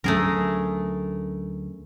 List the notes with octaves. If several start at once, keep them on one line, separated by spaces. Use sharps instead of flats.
D2 F#3 A3 C#4 G#4 A#4